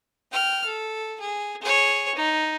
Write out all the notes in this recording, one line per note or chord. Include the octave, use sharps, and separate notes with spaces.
G5 F6
A4
G#4
G#4 C#5
D#4